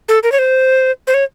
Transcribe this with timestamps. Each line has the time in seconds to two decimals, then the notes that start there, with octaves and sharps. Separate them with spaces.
0.09 A4
0.23 A#4
0.32 C#5
0.39 C5
1.07 C5
1.14 C#5